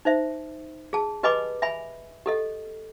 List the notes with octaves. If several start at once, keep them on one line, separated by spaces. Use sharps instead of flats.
D#4 C5 E5
G#4 A5
G4 B4 D#5 G#5 B5 D6
E5 G#5 B5
G4 A4 D#5